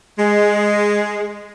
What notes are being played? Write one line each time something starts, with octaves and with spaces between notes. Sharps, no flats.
G#3